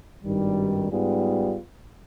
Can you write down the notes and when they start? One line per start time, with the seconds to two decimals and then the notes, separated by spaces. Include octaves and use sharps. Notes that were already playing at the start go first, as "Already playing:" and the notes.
0.23 G#1 G2 D#3 G3
0.90 G#2 G3 B3 F4 G#4